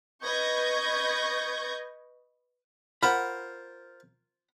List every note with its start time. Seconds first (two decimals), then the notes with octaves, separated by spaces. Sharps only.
0.23 B4 D#5 C#6 G6 G#6 A#6
3.03 F4 A#4 C5 F#5 B5